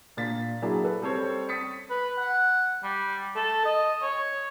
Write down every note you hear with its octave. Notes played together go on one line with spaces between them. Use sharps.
A#2 D4 F5 A6 B6
F#3 A#3 D4 E4 G#4
A4 B4
G3 C4 A4 C5 C#5
D#6 A6 B6 C#7
B4
F#5
G3
A4
D#5
C#5